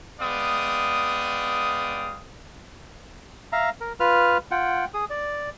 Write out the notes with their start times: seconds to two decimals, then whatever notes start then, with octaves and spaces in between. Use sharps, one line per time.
0.20 G#3 B3 D5 F5 G5 D#6
3.52 E5 F5 A#5
3.80 A#4
4.00 F4 B4 F6
4.51 F4 F#5 G5
4.94 G#4 D#6
5.10 D5